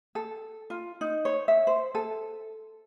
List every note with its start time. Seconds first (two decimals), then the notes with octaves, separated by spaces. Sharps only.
0.15 A4
0.70 F4
1.01 D#4
1.25 C#5
1.48 E5
1.67 C5
1.95 A4